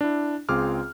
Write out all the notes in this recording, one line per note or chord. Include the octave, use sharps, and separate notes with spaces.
D4 E4
C#2 C4 F4 G#4 D6 F6